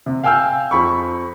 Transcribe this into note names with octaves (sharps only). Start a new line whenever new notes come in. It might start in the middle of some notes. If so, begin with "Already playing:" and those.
C3
F5 G5 G#5 E6 F6 G6
F2 B5 C#6